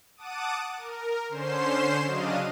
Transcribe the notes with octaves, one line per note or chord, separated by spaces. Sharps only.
F#5 A5 D6 D#6 D#7
A#4
D3 C#4 C5 C6 C7 E7
C#3 F#3 D4 D#5 F5 D#7